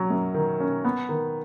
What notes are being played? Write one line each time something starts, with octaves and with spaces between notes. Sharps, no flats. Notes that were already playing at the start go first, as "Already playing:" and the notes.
Already playing: F#3 C#4
F#2
D#3
C#4
B3
D#3